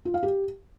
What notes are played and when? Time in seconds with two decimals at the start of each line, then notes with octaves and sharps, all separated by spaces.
0.05 F4
0.14 F5
0.23 G4